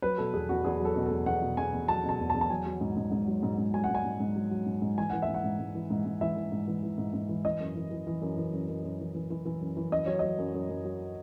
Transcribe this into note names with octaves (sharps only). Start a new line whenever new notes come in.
F#3 B4
B2 A4
E2 G#4
E2 F#4
E2 G#4
F#3 A4
B2
A4
E2
E2 F#5
B2
E2 G#5
E2
F#3 A5
B2
A5
E2
A5
E2
A5
F#3 G#5
F#3
G#2
G#2
G#2
F#3
G#2
G#2
F#3 G#5
F#5
G#2
G#5
G#2
G#2
F#3
F#3
G#2
G#2
E3 G#5
E3 F#5
E5
G#2
F#5
G#2
G#2
E3
G#2
G#2
E3 E5
E3
G#2
E3
E3
G#2
G#2
E3
E3 D#5
F#2
E3
E3
E3
F#2
E3
F#2
F#2
F#2
E3
E3
E3
E3
F#2
E3
F#2 D#5
F#3 C#5
F#3 D#5
F#2
F#2
F#2
F#3